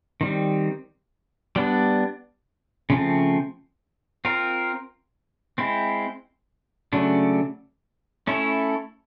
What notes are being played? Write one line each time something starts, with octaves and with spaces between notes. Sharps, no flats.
D#3 G3 C4
G3 B3 D4
C#3 F3 A3 C4
C4 F4 A#4
G#3 C4 E4
C#3 F#3 A3 D4
A3 C#4 E4 A4 C#5